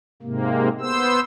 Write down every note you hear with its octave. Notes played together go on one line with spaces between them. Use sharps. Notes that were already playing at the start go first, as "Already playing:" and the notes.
G#2 C3 A#3
B3 C5 E6